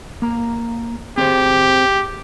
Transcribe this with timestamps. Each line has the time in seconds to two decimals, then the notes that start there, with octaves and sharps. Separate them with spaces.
0.22 A#3 A#5
1.18 C4 G4 G#4 C5